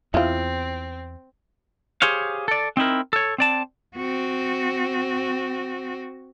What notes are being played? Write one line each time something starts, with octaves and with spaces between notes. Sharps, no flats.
E2 C4 E4 F4
G4 G#4 C5 C#5 F5
A4 D5
C4 D#4 E4 A#4
A4 C#5
C4 D5 A5
C4 F#4